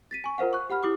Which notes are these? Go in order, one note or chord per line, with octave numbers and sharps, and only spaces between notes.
A6 B6 D#7
G#5 C#6
F4 A#4 C5 F5 F#5
C#6 F#6
G4 F#5 B5 F6
E4 G4 D6 D#6